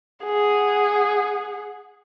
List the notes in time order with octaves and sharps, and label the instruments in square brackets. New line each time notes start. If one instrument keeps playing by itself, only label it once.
[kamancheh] G#4 F#5